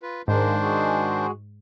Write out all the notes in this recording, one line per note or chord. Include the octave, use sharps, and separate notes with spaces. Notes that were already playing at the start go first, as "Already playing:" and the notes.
F4 B4
G#2 D#3 G#3 A#3 D4 C5
G#3 F#4 G#4